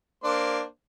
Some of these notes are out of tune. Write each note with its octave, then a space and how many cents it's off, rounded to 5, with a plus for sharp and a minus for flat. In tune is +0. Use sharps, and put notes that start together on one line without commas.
A#3 +0 D4 +10 C5 +0